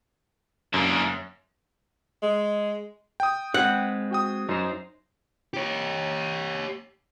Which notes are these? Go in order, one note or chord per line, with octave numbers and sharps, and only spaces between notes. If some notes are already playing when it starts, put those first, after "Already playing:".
F#2 D3 A#3
G#3
G5 D#6
G#3 C4 B4 F#5
F#4 G5 D#6
F#2 D#4 C5 A#5
G4 C#5